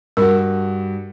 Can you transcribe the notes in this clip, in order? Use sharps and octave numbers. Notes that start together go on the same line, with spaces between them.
G2 F#4 A#4